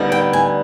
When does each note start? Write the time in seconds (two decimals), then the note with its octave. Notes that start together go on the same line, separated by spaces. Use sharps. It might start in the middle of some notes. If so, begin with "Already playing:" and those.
Already playing: D2 D3 G3 B3 D#4
0.12 G5
0.33 G#5